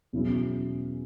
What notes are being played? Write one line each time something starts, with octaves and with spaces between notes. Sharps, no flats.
E2 B2 F#3 C#4 E4